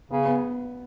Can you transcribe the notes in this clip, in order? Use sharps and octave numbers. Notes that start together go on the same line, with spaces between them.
C#3 B3
B3